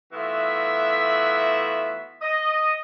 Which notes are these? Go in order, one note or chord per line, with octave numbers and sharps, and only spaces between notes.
E3 A3 B3 F4 F#4 E5
D#5